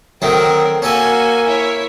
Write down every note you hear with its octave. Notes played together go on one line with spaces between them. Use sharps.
D#3 F#3 A3 C4 A#4
A#3 C#4 F#4 A4 G#5
E4 C#5